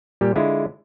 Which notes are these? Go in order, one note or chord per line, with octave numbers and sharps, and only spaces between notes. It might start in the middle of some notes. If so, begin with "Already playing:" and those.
A#2 G3 G4
D3 G#3 E4 F4